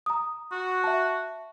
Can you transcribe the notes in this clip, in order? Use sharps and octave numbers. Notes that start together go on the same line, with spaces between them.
A#5 D#6
F#4
E5 A5